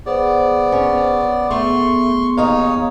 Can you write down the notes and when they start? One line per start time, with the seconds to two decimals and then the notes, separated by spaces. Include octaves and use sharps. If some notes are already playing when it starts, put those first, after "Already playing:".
0.06 B3 G#4 C5 D5
0.72 C#4 C#5
1.51 A3 B3 G#4 C6 C#6
2.37 D#2 D#4 C#5 D#5 F5